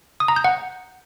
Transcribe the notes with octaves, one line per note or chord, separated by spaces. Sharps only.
D#6
A#5
G6
F#5